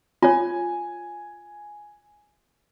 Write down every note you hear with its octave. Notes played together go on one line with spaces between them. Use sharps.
F4 C#5 G#5